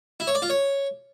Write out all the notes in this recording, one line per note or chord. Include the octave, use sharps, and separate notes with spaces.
E4
C#5
D5
F4
C#5